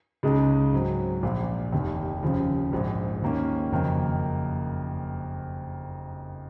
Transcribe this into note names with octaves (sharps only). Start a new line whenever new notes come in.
C#2 C#3 G#3 D#4 G#4
G#2 F#3 C4
A#1 A#2 F3
F1 D#2 D#3
F1 D#2 C#3 F3
A#1 G#2 F3
D#2 D#3 A#3 C#4
F#1 F2 D#3 A#3 D#4